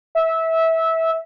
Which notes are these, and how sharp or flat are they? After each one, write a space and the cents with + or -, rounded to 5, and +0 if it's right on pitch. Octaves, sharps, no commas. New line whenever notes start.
E5 -20